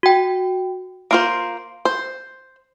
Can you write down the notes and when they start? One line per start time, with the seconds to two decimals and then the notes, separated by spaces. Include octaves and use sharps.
0.03 F#4 G5
1.11 A#3 F4 C5 C6 D7
1.85 C5